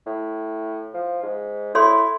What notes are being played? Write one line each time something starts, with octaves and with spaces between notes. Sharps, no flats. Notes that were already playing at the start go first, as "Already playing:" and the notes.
A2
F3
G#2
E4 A4 C#5 C6